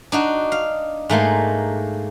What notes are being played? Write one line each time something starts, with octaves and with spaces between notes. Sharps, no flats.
D4 D#4 F#4
F5
G#2 A3 A#3 C6